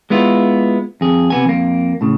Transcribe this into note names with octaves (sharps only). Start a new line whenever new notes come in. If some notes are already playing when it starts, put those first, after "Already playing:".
G#3 B3 E4 F4
F2 G#4
C3 B3 G#5
F2 A#3
A2 C#3